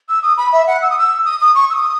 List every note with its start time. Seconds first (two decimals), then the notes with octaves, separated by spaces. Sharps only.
0.09 E6
0.22 D#6
0.37 B5
0.53 E5
0.67 F#5
0.82 E6
0.90 D#6
0.99 E6
1.25 D#6
1.41 D#6
1.55 C#6
1.70 E6
1.73 D#6